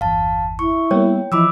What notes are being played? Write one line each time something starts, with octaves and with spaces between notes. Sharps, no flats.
G1 E2 F5 A5
E4 C#6
G3 A#3 B3 C#5 G5
E3 F3 E4 D#5 B5 D6 E6